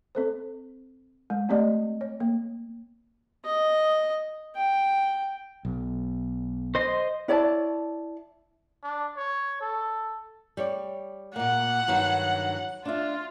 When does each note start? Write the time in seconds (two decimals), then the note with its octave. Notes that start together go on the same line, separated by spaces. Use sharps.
0.15 C4 A4 C5
1.30 G#3
1.49 A3 C4 G4 D5 D#5
2.01 C#5
2.20 A#3
3.45 D#5
4.56 G5
5.65 B1
6.75 C5 D#5 C6
7.28 E4 C#5 D5 A5
8.83 D4
9.17 C#5
9.61 A4
10.57 G3 C#5 D5
11.36 A#2 A#3 F#5
11.88 G2 D#3 F#3
12.85 D4 F4 E5